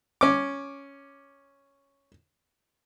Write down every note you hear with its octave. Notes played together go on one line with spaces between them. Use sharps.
C#4 D6